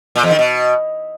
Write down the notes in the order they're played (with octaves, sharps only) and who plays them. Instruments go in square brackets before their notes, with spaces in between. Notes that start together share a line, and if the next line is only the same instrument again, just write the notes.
[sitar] A#2
E2
D#3
B2